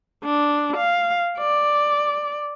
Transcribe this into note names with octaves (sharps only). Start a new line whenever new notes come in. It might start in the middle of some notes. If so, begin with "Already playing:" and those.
D4
F5
D5